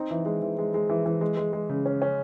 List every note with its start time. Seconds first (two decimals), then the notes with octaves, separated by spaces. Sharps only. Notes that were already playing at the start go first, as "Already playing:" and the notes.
Already playing: C4 D#4
0.11 E3
0.25 G#3
0.42 E3
0.58 G#3
0.74 G#3
0.89 E3
1.06 E3
1.21 G#3
1.37 G#3
1.53 G#3
1.69 C#3
1.86 C#4
2.02 C#4